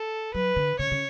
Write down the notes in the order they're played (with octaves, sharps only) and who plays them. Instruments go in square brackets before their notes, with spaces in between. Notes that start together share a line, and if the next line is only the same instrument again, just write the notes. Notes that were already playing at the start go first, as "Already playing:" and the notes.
Already playing: [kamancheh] A4
[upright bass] F#3 [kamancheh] B4
[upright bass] D3
[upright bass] C#3 [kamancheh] C#5
[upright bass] C#3